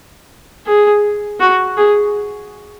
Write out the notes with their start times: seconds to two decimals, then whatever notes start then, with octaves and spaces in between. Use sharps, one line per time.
0.67 G#4
1.40 F#4
1.78 G#4